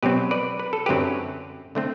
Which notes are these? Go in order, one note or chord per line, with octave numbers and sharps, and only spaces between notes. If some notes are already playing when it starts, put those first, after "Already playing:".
B2 F#3 C4 G4 B4
B4 D5
B4
A4
F#2 D3 F#3 C4 G4 B4
D3 A3 C4